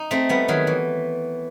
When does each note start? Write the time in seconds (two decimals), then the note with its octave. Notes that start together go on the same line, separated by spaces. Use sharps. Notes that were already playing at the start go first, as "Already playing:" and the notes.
Already playing: D#4
0.11 A3 C4
0.29 G3 B3
0.48 D#3 F#3
0.67 E3